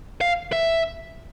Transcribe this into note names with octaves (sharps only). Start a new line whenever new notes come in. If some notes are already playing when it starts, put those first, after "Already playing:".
F5
E5